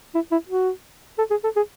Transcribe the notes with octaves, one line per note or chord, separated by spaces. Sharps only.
E4
E4
F#4
A4
G#4
A4
G#4